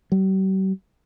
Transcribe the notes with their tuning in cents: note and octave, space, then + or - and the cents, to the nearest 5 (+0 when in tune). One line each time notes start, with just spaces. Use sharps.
G3 -45